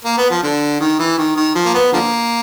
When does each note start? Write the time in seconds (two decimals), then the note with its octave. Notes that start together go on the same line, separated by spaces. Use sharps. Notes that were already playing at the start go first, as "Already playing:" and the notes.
0.05 A#3
0.18 B3
0.30 F3
0.43 D3
0.80 D#3
0.99 E3
1.18 D#3
1.37 D#3
1.55 F3
1.65 A#3
1.75 B3
1.93 D3 F3 A#3